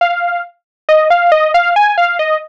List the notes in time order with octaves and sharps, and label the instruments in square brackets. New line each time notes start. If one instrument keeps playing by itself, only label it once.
[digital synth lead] F5
D#5
F5
D#5
F5
G#5
F5
D#5